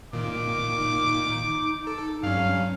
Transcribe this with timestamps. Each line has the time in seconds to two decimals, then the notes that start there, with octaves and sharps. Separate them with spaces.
0.13 A#2 D#3 D6
0.76 D#4
1.87 A4
2.23 G2 F#3 C#4 F5